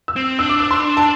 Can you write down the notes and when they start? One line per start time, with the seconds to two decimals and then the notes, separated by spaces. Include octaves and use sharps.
0.08 E6
0.16 C4
0.39 D4 E6
0.49 D6
0.60 E6
0.71 C6
0.97 A5